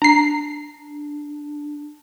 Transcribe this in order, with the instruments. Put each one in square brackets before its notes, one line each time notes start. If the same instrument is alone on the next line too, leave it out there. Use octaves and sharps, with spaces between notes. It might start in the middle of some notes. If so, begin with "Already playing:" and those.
[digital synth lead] D4 [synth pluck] A#5 C7